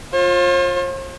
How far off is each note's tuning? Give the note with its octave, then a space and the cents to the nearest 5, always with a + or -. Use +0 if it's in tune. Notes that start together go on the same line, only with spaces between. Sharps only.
F4 +15 C5 +45